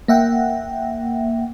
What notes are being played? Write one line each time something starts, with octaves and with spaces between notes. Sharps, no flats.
A#3 E5 F#5 G5